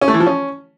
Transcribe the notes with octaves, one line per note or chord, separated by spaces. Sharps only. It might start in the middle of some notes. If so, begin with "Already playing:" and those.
C#4
A3
E3
F3
C#4